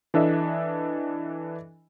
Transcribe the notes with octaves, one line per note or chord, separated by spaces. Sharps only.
E3 D4 A4 D#5 E5